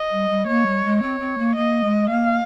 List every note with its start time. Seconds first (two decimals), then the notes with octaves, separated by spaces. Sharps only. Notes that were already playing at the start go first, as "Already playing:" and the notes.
Already playing: D#5
0.10 G3
0.29 G3
0.47 A#3 C#5
0.66 G3
0.84 G#3
1.01 C4 C#5
1.20 C4
1.38 A#3
1.55 A#3 D#5
1.84 G#3
2.09 A#3 F5